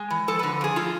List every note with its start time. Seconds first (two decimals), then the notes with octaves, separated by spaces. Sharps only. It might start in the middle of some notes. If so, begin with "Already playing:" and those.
Already playing: G#3
0.10 E3
0.28 F3 A4
0.39 D3 B4
0.61 F3 G#4
0.76 A3 F4